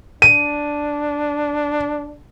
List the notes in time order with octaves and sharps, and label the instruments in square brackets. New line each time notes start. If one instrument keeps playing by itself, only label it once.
[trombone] D4 [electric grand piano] D#7